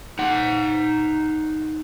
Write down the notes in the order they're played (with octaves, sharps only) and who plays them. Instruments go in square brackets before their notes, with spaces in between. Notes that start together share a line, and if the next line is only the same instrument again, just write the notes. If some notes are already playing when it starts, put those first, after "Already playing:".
[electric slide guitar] D#4 F#5